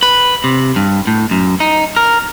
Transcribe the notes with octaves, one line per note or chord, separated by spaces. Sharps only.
B4
C3
G2
A2
F#2
D#4
A#4